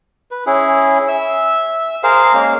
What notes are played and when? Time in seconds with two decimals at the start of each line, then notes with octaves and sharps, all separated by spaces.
0.31 B4
0.46 C#4 E4 G#4
1.08 E5 E6
2.03 G#4 A#4 C5 F5
2.34 G#3 A#3 C#4 F5